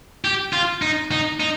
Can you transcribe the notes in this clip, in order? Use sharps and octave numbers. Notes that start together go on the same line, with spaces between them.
G4
F4
D#4
D#4
D#4